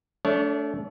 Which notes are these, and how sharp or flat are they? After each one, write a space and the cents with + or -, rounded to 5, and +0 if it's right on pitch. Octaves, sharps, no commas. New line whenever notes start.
A3 +0 D4 -30 C#5 +0